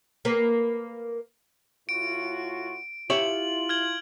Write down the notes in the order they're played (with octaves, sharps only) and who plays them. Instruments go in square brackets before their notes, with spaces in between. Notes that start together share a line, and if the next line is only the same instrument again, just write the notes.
[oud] A#3 B4
[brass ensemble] A2 F4 F#4 [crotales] D7
[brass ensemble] E4 F4 [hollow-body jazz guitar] G4 C#5 E5 [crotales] F#7
[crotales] F6 G#6 F#7